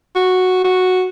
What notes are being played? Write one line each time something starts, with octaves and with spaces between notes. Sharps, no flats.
F#4
F#4